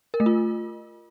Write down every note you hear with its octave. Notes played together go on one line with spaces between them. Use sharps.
A#4
A3
F4